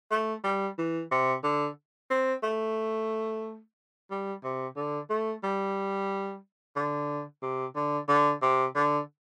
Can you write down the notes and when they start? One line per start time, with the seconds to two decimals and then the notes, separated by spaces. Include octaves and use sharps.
0.11 A3
0.44 G3
0.78 E3
1.11 C3
1.44 D3
2.10 C4
2.43 A3
4.10 G3
4.44 C3
4.76 D3
5.10 A3
5.43 G3
6.76 D3
7.42 C3
7.75 D3
8.08 D3
8.42 C3
8.76 D3